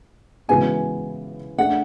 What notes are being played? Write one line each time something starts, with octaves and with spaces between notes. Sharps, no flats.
C#3 E3 G#3 B3 F#4 G#5
A3 D4 G#4 F#5